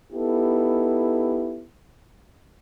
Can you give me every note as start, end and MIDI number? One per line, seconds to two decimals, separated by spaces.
0.13 1.65 59
0.13 1.65 63
0.13 1.65 64
0.13 1.65 67
0.13 1.65 69